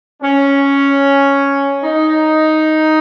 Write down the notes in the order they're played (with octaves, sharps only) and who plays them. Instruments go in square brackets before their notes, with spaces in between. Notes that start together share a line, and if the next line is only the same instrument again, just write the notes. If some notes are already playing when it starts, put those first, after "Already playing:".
[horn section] C#4
D#4